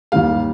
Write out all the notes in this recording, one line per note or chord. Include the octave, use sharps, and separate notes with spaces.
D#2 D#3 G3 F5